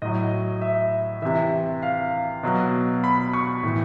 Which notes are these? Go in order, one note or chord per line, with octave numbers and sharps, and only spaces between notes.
A2 F#3 D#5
E5
C3 E3 E5
F5
B2 F#3
B5
C#6
A2 E3